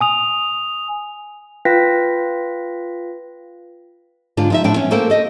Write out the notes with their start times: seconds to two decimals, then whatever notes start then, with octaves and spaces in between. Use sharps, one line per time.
0.01 G#5 D#6 F7
1.65 F4 B4 F5 G5 A#6 B6
4.37 G#2 D3 D4 F4
4.50 F3 D#4 E5
4.64 A2 F3 D4 A4 G5
4.76 B3 C#4
4.91 A3 A#3 A4 A#4 C5 G5
5.10 A4 D#5